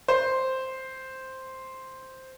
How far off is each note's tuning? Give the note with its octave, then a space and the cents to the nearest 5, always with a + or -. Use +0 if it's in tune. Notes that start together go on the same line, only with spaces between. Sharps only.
C5 +0